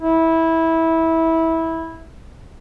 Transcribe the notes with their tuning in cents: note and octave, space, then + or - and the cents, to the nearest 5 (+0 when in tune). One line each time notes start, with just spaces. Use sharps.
E4 -15